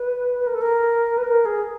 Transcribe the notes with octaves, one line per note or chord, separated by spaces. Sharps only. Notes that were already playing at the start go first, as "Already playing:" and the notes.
Already playing: B4
B4
A#4
A4
A#4
B4
A#4
G#4